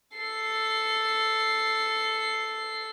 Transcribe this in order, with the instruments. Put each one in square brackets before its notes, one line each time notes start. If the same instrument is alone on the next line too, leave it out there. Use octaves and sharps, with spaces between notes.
[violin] A4 C7